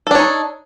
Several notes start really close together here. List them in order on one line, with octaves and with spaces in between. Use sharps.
A4 D4 C#5 D#4